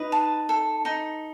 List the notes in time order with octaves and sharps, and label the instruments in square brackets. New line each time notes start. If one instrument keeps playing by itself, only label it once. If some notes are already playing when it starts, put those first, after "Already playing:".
Already playing: [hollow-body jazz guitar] D#4 [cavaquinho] B4
[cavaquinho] A5
A4
D#4